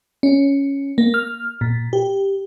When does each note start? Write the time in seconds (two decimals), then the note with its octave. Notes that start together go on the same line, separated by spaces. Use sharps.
0.23 C#4
0.98 A#3
1.14 F6
1.61 A#2
1.93 G4